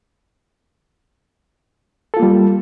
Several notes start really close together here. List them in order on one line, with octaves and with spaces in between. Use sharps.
A4 F4 A#3 G3